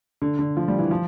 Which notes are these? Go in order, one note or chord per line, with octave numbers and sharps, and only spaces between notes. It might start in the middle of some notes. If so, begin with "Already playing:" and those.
D3
D3
F3
G3
E3
F3